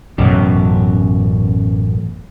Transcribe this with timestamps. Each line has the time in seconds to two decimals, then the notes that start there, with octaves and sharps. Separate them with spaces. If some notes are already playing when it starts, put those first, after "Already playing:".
0.18 A1 F#2 B2